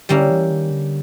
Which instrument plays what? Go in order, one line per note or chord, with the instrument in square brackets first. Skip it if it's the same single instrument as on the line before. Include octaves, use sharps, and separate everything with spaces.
[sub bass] D3 [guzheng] G3 A#3 C#4 E4
[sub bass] E3
D#3
D3